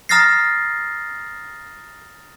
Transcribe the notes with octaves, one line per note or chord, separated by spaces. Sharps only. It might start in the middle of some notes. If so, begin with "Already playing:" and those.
A#5 D#6 F6 A6 A#6 C7